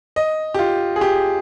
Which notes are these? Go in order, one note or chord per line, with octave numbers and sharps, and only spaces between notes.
D#5
G4
F4
G#4
G4